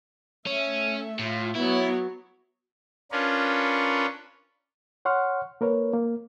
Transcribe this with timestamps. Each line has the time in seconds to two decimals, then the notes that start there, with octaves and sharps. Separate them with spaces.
0.46 A3 C#4 E5
1.19 A2 F4
1.56 F#3 B3 E4 C#5
3.12 C#4 D4 F4 A#4 B4 C#5
5.05 C#5 F#5 C6 C#6 F6
5.61 A#3 A#4 B4 C#5
5.94 A#3